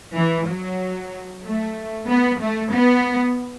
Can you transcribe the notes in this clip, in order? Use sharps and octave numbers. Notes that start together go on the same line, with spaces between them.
E3
F#3
A3
B3
A3
B3